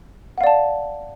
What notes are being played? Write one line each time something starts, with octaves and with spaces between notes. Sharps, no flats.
D5 F5 F#5 A5